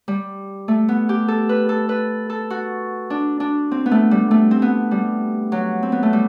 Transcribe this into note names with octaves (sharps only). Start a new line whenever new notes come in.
G3
A3
B3
G4
A4
B4
A4
B4
A4
F#4
D4
D4
C4
B3
A3
G3
A3
C4
B3
G3
F#3
C4
B3
A3
G3